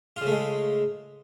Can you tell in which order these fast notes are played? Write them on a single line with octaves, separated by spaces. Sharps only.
F4 C#3 A3 G#3